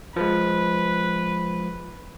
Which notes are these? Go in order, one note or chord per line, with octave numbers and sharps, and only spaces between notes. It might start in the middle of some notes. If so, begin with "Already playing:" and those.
F3 G#3 B4